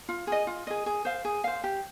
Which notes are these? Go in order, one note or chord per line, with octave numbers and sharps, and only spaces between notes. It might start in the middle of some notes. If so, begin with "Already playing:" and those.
F4
G#4 D#5
F4
G#4 D#5
G#4
C5 F5
G#4
C5 F5
G4